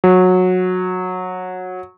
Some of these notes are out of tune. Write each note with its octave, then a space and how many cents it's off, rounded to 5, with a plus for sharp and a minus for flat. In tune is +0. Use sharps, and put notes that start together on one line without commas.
F#3 -15